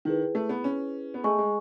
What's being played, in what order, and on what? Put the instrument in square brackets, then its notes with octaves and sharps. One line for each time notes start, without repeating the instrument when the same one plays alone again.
[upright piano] D#3 [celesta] E4 G#4 B4
[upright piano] A3
B3
C#4
B3
[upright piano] A3 [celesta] G#4 D#5 G#5 C#6
[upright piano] G#3